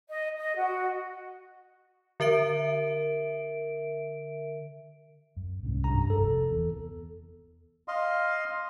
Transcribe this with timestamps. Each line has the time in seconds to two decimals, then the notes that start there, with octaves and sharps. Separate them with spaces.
0.09 D#5
0.37 D#5
0.57 F#4
2.20 D3 A#4 E5 D7
5.36 F#2
5.63 C2 G#2 C#4
5.84 G2 A#5
6.10 F1 A4
6.50 E2
7.88 D#5 F5 C6